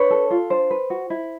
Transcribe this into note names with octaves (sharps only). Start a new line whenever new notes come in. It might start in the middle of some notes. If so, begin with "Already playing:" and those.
Already playing: D4 B4 C#5
A4
F4
D4 C5
B4
F#4
E4